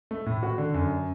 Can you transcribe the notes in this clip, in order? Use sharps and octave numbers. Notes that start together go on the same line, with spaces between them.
A3
A2
F#4
D3
F#2